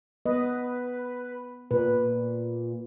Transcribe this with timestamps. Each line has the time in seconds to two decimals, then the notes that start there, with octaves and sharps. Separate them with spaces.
0.26 B3 B4 D#5
1.71 A#2 B4